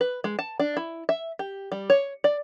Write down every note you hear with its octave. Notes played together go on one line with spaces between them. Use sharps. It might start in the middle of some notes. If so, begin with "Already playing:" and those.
B4
G#3
A5
D4
E4
E5
G4
G3
C#5
D5